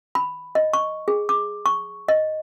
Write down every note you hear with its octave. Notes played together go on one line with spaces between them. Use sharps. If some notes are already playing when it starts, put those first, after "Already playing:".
B5
D#5
C#6
G#4
D6
C#6
D#5